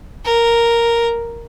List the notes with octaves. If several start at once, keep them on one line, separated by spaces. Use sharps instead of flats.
A#4